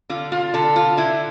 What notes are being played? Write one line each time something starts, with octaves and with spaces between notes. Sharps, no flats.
D3 F4
F4
D3 A4
F4
D3 E4